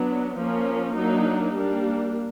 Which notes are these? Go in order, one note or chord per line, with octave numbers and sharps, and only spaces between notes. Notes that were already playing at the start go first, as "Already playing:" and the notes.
Already playing: F#3 B3 D4
F3 A#3 C#4
F#3 A#3 D4 D#4
G3 A#3 D4